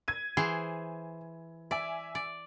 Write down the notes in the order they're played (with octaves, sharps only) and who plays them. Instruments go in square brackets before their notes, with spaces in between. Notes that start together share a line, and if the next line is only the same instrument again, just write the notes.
[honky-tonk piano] G#6 D#7
[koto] E3 G#4 C5
[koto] D5 [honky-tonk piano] E5 G#5
[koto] D5